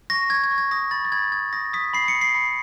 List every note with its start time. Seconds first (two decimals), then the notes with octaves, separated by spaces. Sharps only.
0.10 C#6 A#6
0.30 C#6 G#6
0.44 G#6
0.51 C#6
0.58 G#6
0.71 D#6 A#6
0.91 B5 A6
1.05 A6
1.12 B5 G#6
1.32 D#6 G#6
1.53 D#6 A#6
1.73 D#6 B6
1.93 B5 C7
2.08 C#7
2.15 B5
2.21 C7
2.35 B5